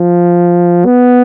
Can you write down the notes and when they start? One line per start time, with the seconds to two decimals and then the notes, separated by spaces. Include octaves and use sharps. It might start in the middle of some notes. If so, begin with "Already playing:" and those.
Already playing: F3
0.85 B3